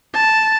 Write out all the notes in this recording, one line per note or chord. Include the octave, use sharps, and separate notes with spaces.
A5